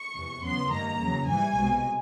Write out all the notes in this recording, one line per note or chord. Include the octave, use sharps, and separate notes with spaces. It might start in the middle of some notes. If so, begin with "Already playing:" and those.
Already playing: C#6
E2 C3 E3
E2 C#3 F#3 B3 C6
G2 D#3 G3 A#3 A#5
E2 C#3 F#3
G#2 E3 G3 G#5
C2 B2 G#3